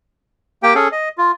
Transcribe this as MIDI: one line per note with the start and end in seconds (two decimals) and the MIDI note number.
0.63 0.74 58
0.63 0.74 67
0.63 0.74 79
0.75 0.88 61
0.75 0.88 68
0.75 0.88 69
0.92 1.09 75
1.18 1.32 65